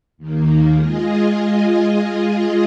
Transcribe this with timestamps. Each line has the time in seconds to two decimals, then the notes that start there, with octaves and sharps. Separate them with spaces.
0.18 D#2 D#3 A#3
0.76 G#3 F4 G#4 D#5